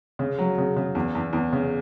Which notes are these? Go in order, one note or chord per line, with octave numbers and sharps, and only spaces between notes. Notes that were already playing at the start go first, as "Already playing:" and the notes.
C#3
F#3
C#3
C#3
E2
E2
E2
C#3